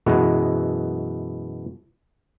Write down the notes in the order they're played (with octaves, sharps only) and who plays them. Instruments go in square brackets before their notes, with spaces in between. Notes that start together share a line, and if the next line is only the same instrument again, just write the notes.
[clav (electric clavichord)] F#2 B2 E3 G#3